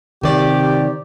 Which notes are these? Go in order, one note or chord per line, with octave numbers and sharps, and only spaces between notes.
C3 D#3 G4 D5